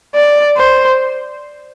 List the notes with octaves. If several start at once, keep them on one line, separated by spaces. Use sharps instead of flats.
D5
C5